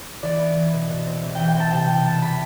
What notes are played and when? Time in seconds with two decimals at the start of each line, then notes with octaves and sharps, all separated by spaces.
0.23 E3 D5
0.39 B3
0.56 E3
0.73 B2
0.90 B2
1.06 C4
1.23 E3
1.35 G5
1.40 E3
1.48 G5
1.56 C4 A5
1.72 C3 G5
1.89 C3 G5
2.05 B3 A5
2.22 E3 B5